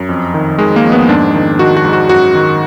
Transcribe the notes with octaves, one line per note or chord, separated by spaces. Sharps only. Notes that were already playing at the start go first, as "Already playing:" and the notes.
Already playing: F#2
F2
D#3
D#3 G#3
A#3
F2
B3
G#2 D4
D#3
D#3 F#4
F#4
G#2
F#4
F#2 F#4
D#3